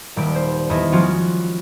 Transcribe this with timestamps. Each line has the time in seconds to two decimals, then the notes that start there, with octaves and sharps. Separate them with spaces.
0.16 D#1 G3 D7
0.35 C5
0.70 E2 A4 D#5
0.92 F3 G#3 C#4 F4 F#4